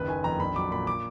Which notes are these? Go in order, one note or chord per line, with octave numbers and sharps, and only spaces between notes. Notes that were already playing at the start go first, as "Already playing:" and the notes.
Already playing: F#1 D#2 B4
D#3 G#5
F2 A#5
A#1 B5
F#3 D6
A#2 B5
D6